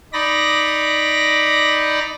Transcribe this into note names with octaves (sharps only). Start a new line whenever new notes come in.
D#4 D5 B5 A#6